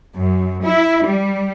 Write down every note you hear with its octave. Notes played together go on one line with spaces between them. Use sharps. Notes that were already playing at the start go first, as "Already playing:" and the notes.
F#2
E4
G3